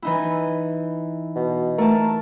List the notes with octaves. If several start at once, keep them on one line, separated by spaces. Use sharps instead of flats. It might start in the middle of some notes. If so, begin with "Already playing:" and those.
E3 D#4 E4
B2
A3 A#4 A5